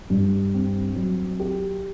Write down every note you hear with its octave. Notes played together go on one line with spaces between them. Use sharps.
G2
C4
F#3
G4